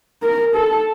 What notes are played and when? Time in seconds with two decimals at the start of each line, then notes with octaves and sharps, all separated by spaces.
0.22 A#4
0.55 A4